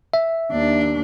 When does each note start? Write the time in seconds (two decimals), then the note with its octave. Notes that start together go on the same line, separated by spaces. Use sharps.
0.14 E5
0.52 D#2 D4